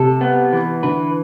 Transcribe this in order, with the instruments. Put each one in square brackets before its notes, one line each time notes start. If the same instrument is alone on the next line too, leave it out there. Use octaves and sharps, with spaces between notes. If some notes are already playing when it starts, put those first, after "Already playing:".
Already playing: [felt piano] C3 [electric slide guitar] A4
[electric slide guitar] B3
E3
[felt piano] D3 [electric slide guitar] B4